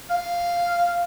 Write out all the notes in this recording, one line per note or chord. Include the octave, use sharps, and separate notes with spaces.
F5